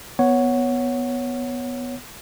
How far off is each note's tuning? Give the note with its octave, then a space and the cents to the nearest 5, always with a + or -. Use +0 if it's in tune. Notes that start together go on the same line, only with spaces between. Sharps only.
B3 +0 C#5 +0 F#5 +0